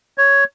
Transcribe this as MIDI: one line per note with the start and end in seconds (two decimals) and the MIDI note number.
0.18 0.44 73